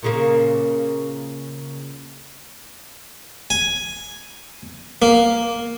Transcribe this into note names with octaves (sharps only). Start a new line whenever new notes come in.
A#2 C#3 A#3
G#5
A#3